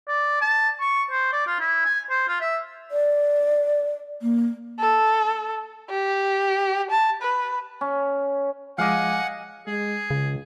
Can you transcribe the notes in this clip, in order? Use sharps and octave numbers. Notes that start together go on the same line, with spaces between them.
D5
A5
C#6
C5
D5
F4
E4
G#5
C5
F4
E5
D5
A#3
A4
G4
A5
B4
C#4
F3 G#3 D#5 F5 F#5 G#5 D6
G#3 G#4
C#2 C#3